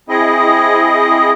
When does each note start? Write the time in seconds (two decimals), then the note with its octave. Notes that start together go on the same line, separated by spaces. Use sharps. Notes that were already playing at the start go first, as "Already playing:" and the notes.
0.09 C4 E4 G#4 D#5